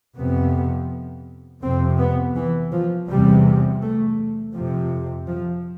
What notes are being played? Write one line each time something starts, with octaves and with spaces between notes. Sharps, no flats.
F2 C3 B3
F2 C3 C4
B3
E3
F3
E2 C3 G3
A3
F2 C3 F3
F3